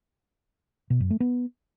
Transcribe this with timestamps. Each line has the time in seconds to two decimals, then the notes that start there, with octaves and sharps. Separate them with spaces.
0.90 B2
1.00 F#2
1.10 A3
1.20 B3